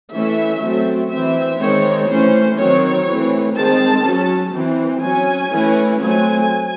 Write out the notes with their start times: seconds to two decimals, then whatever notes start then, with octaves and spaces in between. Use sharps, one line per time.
0.12 E3 A3 C#4 E5
0.61 F#3 A3 C4
1.11 E3 C4 E5
1.60 D#3 G#3 C4 C#5
2.09 E3 A3 C#4 C5
2.57 D#3 F#3 C4 C#5
3.07 E3 A3 C4
3.56 D#3 G#3 C4 A5
4.05 F#3 C#4
4.54 E3 C4
5.03 F#3 C#4 G#5
5.52 E3 A3 C#4
6.01 F#3 A3 C4 G#5